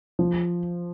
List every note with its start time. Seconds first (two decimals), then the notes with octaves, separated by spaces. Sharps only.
0.19 F3